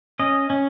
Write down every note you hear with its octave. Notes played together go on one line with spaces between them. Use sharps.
C#4 D#5
C#4